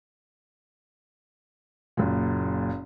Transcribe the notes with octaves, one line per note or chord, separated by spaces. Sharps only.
F#1 A#2